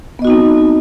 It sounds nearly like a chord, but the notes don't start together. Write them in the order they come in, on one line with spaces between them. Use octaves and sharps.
B3 D#5 F#4 D#4 C4